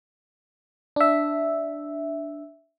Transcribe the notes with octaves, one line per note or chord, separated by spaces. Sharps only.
D4 E5